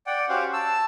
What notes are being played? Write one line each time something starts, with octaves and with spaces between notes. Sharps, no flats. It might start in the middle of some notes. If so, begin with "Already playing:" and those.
D5 F#5 G5
C#4 F#4 G4 C5 F5 F#5
A5 E6